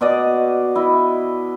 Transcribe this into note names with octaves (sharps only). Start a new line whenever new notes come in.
B2 D5 D#5
E4 D#5